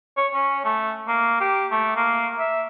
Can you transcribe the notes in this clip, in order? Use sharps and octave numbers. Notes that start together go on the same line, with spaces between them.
C#5
C#4
A3
A#3
G4
A3
A#3
E5